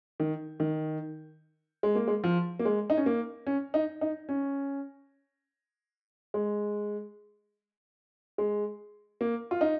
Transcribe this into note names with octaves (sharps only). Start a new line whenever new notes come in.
D#3
D#3
G#3
A#3
G#3
F3
A#3
G#3
D#4
C#4
A#3
C#4
D#4
D#4
C#4
G#3
G#3
A#3
F4
D#4